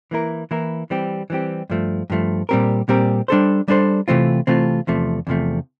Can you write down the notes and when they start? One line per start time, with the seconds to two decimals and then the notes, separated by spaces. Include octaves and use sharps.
0.11 E3 A#3 E4 A#4
0.51 E3 A#3 E4 A#4
0.90 E3 G3 C4 G4
1.30 E3 G3 C4 G4
1.70 G2 F3 A3
2.10 G2 F3 A3
2.49 A#2 G3 C4 G4 A#4
2.89 A#2 G3 C4 G4 A#4
3.28 G3 D4 A4 C5
3.68 G3 D4 A4 C5
4.08 C3 E3 A3 C4 F4
4.47 C3 E3 A3 C4 F4
4.87 E2 C3 F3 A3
5.27 E2 C3 F3 A3